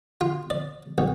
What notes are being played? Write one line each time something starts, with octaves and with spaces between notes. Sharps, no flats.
F4
D5
B1